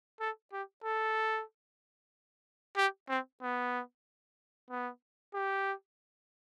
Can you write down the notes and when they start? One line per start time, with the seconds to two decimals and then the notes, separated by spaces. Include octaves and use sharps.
0.20 A4
0.53 G4
0.84 A4
2.77 G4
3.09 C4
3.42 B3
4.70 B3
5.34 G4